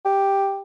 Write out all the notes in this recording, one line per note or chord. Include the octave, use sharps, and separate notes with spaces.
G4